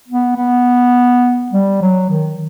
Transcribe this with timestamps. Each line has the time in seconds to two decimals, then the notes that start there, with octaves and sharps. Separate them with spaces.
0.08 B3
0.36 B3
1.52 G3
1.81 F#3
2.10 D#3